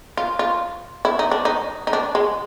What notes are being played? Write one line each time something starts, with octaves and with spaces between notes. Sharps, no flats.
F4
F4
E4
D#4
D4
D#4
D#4
D4
G#3